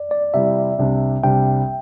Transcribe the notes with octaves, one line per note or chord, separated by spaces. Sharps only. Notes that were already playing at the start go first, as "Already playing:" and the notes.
Already playing: D5
D5
C3 G3 E4 E5
C2 C3 G3 D4
C2 C3 G3 D4 G5